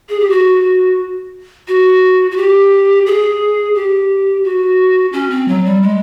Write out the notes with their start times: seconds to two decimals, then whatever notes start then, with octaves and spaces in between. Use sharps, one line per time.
0.09 G#4
0.20 G4
0.30 F#4
1.68 F#4
2.31 F#4
2.37 G4
3.06 G#4
3.75 G4
4.44 F#4
5.13 C#4
5.30 C4
5.48 F#3
5.65 G3
5.82 G#3